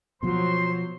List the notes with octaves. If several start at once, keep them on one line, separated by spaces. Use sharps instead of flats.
B2 F3 F#3 C5 C6